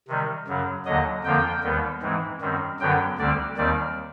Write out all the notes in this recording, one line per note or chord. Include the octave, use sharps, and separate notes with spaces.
C3 D#3 G3
F#2 C#3 F#3
D#2 D3 F#3 D#5
F2 D3 F3 A#3 G5
D#2 D#3 G3 B3
G#2 E3 G#3 C4
F#2 D#3 G3 C4
F#2 D3 F#3 B3 G5
D2 D3 G3 C4 D5
D#2 D#3 G3 C4 D5